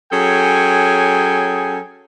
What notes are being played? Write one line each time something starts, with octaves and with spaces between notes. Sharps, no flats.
F#3 C#4 G#4 A4 G5 G#5